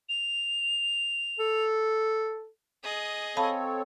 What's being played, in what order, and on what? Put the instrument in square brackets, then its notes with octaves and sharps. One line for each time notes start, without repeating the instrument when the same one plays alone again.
[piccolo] F7
[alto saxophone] A4
[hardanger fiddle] G#4 D#5
[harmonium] C4 A4 C#5 [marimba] F5 A5 B5